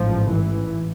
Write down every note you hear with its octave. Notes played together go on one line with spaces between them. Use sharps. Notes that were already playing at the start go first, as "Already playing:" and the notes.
Already playing: A1 G#2 F3
E3